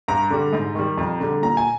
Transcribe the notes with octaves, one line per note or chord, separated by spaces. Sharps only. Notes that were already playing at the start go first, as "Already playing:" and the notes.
G2 A#5
D3 G3
G#2
D#3 G3
F2
D3 G3
A#2 A#5
G#5